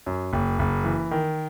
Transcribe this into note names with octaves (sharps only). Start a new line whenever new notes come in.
F#2
F#1
F#1
E3
D#3